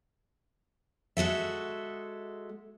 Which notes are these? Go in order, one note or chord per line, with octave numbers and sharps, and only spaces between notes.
G#3 F#4 A4 E5